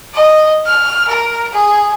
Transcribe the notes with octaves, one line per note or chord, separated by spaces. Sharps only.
D#5
F6
A#4
G#4